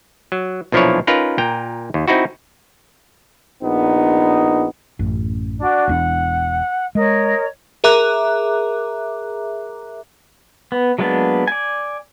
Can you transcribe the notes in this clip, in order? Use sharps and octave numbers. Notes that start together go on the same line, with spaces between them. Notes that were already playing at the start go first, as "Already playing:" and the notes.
F#3
B1 A#2 F3 D4 E4 C#5
C#4 D#4 F4 A#4 B4
A#2 G5 A#5
D#2
C4 D#4 E4 F#4
A#1 B3 D#4
A1 F#2
D4 F#4 D5
E1 E2 D4 F#5
G#3 A#4 C#5 D#5
G#4 A#4 E5 A#5 D6 F#6
B3
F#3 G#3 A#3 B3 D4
D5 G#5